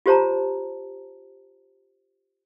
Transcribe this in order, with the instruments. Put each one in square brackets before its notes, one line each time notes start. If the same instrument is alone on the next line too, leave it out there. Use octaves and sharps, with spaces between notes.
[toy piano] F4 G4 C5 C#5 A5 A#5